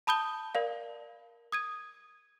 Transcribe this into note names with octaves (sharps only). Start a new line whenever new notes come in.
A5 B5 D#6 G6 G7
A#4 D5 F5
D#6 G#6 D#7